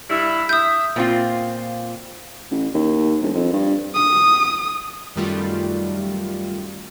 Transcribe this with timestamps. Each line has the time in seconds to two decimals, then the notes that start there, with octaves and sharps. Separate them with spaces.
0.10 G2 E4
0.49 E5 D#6 G6
0.96 A#2 C4 F4
2.51 A1
2.74 D#2
3.21 E1
3.34 F2
3.53 G2
3.95 D#6
5.16 F#2 D#3 G3 A3 F4 F#4